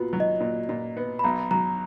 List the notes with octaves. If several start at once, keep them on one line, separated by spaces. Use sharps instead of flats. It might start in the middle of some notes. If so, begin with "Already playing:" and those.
Already playing: A#2 B3 F4 F#4
F#3
D#5
A#2
A#2
B3
B5
B1 A#5
F#3 A#5